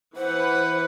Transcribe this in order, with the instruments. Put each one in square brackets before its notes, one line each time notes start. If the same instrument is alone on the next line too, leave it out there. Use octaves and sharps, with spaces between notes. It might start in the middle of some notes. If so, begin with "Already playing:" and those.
[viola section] E3 B4 F#5 [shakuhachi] C5